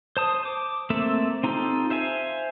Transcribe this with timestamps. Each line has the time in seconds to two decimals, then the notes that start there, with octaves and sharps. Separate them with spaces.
0.17 C5 A5 D#6
0.45 D6
0.90 A3 A#3 C4 A4 E5
1.44 C4 D#4 F4 G4 A4
1.90 C5 E5 F5 G#5